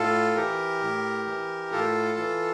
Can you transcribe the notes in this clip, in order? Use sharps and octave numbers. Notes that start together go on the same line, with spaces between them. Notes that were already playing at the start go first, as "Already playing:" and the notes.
Already playing: A2 F4 A4
E3 G4 A#4
A2
E3
A2 F4 A4
E3